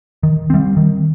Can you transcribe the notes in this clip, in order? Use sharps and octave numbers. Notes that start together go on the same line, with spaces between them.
D#3
G3 C4
D#3